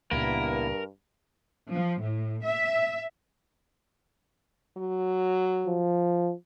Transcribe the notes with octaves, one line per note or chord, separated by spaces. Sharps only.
C#2 G2 A#2 A#3 B3 E4 A#4
F3
A2
E5
F#3
F3